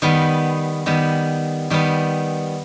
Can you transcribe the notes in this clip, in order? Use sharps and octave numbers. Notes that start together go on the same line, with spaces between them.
D#3 G3 B3
D#3 G3 B3
D#3 G3 B3